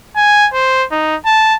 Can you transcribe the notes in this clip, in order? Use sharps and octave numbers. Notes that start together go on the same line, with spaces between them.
G#5
C5
D#4
A5